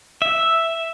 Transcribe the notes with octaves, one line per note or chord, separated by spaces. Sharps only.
E5